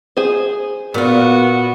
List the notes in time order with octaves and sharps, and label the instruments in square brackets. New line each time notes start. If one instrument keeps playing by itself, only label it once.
[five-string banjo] G#4 C5
[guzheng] A#2 F4 [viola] B3 F#4